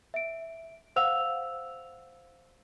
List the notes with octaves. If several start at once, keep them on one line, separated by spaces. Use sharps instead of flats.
E5 D7
C5 F5 F#5 E6 F7